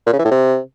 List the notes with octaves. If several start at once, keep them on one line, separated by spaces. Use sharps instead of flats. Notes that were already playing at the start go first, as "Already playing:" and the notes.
A#2
C#3
E3
A2
C3